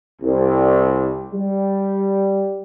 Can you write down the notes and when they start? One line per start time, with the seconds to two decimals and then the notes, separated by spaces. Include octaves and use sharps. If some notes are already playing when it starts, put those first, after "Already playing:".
0.22 C2
1.32 G3